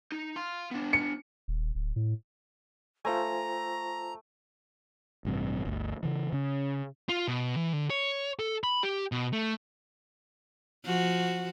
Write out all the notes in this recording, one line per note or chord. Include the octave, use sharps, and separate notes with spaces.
D#4
F5 C6
B3 D4
C#7
D#1
D1
A2
A3 F4 C5 G#5 A#5
A1 G2 C3
G1 D2
C#3 E3
C#3 C#4
F4
B2
E3
D3
C#5
A4
B5
G4
B2
A3
F3 F#4